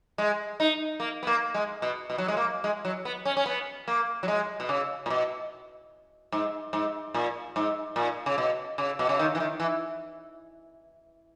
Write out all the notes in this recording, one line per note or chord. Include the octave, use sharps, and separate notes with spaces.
G#3
D#4
A#3
B3
A#3
G#3
B2
B2
F#3
G#3
A#3
G#3
F#3
B3
C#4
C#4
B3
A#3
F#3
G#3
B2
C#3
A#2
B2
G#2
G#2
A#2
G#2
A#2
C#3
B2
C#3
B2
C#3
D#3
E3
D#3
E3